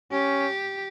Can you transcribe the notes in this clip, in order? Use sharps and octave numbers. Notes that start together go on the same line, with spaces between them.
C#4 G4